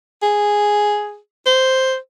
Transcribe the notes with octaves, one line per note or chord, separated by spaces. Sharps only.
G#4
C5